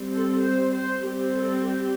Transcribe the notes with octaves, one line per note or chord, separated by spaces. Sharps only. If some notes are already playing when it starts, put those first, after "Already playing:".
Already playing: G3 C4
A4
C5
C5
G3 C4 G4
A4
G4